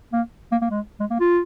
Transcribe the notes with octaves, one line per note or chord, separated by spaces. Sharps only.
A#3
A#3
A#3
G#3
G#3
A#3
F4